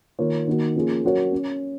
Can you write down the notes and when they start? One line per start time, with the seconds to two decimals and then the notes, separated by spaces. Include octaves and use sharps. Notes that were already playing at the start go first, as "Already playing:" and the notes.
0.19 D#3 A#3 F4 A#4 C#5
0.47 D#3 A#3 D#4 F#4
0.76 F3 A#3 C#4 F4 G#4
1.04 F#3 C#4 F#4 A#4 C#5
1.32 C#4